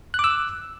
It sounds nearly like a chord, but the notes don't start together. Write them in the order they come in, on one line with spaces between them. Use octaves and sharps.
F#6 D6 E6